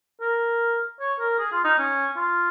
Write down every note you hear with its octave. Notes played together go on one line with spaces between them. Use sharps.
A#4
C#5
A#4
G#4
F4
D#4
C#4
F4